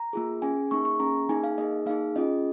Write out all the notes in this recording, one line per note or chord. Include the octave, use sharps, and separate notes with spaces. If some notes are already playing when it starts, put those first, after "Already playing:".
Already playing: A#5
A#3 F4 G#4
C#4 G#4 G#5
A#3 D#4 G#4 C#6
C#6
A#3 C#4 G#4 A#5
A#3 D#4 G#4 G#5
F5
A#3 D#4 G#4 D#5
A#3 D#4 G#4 F5
C#4 F4 G#4 D#5